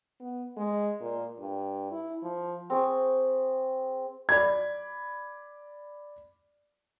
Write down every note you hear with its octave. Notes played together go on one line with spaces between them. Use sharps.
B3
G#3
A#2
G2
E4
F3
C4 G#4 C#6
D5 B5 G#6